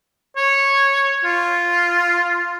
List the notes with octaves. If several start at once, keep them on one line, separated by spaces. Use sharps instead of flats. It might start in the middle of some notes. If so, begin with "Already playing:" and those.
C#5
F4